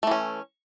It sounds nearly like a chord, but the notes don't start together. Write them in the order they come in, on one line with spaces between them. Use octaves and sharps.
A3 E3 C#4